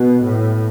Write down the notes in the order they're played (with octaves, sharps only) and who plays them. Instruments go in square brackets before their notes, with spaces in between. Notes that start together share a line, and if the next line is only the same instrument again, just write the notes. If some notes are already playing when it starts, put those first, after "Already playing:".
Already playing: [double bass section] B2
A2